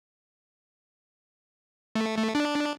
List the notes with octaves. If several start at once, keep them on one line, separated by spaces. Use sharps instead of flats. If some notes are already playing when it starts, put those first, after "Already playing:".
A3
A3
D4